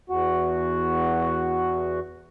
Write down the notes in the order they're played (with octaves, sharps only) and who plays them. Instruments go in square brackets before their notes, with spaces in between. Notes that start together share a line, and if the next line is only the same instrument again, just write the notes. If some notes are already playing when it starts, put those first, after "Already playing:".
[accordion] E2 F#4